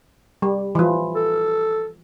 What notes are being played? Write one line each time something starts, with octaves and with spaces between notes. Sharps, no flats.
G3
E3 F3
A4